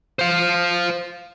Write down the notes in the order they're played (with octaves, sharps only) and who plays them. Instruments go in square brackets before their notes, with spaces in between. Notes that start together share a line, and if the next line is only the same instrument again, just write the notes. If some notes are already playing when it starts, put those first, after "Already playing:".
[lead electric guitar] C5 F5